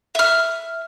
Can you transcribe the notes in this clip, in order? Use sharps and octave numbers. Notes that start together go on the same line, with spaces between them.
E5 F6